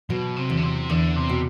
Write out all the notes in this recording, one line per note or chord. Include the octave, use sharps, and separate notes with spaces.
B2 F#3
C3
E2
D3
C3
E2 D3
C3
B2